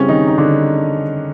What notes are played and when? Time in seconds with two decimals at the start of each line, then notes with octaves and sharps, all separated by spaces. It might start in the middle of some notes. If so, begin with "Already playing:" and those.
Already playing: C#3 G3 C4 C#4 E4 G4
0.08 D#3 D#4
0.28 D#4
0.37 D3 D4